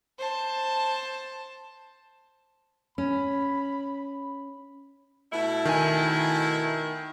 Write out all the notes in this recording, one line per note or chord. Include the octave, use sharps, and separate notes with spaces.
C5 A5
C#4 B5
B2 A3 E4
D#3 G#5